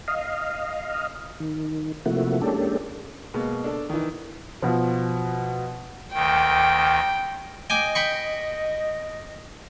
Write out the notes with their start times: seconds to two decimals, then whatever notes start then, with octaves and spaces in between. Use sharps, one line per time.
0.08 D#5 F5
1.40 D#3
2.06 C3 F3 A3 A#3 E4 F#4
2.42 G#3 A#3 C#4 D4 G4 A4
3.34 B2 G#3 A#3
3.64 D4 A4
3.90 D#3 E3
4.62 B2 F3
6.14 D2 D#3 G5
7.70 D#5 G5 G#5 D6
7.95 G5 B5 C#6